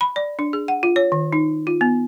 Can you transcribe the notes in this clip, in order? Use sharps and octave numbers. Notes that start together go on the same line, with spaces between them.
B5
D5
D4
G#4
F#5
F4
C#5
D#3
D#4
F4
B3